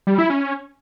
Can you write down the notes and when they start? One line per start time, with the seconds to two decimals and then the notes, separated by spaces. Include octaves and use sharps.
0.07 G3
0.18 E4
0.30 C#4